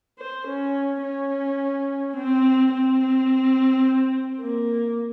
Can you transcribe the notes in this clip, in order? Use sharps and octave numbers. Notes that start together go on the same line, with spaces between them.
C5
C#4
C#4
C4
C4
A#3